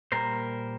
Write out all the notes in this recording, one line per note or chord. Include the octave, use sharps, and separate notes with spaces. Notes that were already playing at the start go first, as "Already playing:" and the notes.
A#2 G3 A#3 A#4 C5